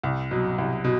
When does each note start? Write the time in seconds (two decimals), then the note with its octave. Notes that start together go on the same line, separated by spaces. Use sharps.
0.03 C2
0.31 B2 F#3
0.58 C2
0.84 B2